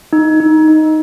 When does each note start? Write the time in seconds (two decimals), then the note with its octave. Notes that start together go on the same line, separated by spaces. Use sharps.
0.13 D#4
0.40 D#4
0.68 D#4